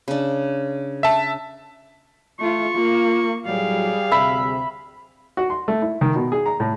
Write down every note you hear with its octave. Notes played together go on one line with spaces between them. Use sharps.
C#3 D4
E5 A5
A3 F4 C#6
A#3 F4
A2 F#3 G3 G#4 F5
D2 C3 E5 B5
F#4
C6
A3
E4
D#3
B2
G#4
A#5
A2